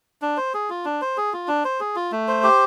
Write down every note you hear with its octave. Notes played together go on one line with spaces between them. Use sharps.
D4
C5
G#4
F4
D4
C5
G#4
F4
D4
C5
G#4
F4
A3
C5
G4